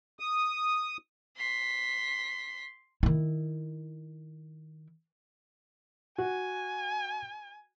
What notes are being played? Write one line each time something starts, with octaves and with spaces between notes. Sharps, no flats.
D#6
C6 B6
D#3 E4
F#4 G#5